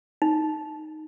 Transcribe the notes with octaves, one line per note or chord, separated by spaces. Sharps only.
D#4